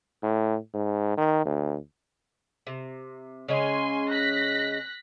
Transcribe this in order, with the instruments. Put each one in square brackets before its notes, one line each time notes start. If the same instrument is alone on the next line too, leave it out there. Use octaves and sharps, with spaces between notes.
[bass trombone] A2
G#2
D#3
D2
[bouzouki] C3
[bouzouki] C#3 G#3 C#4 [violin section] G#5 C6
[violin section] F#6 A#6 B6